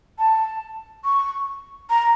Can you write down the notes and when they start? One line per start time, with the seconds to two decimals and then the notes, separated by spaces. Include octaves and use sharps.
0.19 A5
1.04 C#6
1.90 A#5